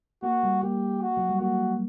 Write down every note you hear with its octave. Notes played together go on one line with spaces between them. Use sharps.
A#3 F#4
G3
A#3 G4
F#4
F#3
G3
A#3 F#4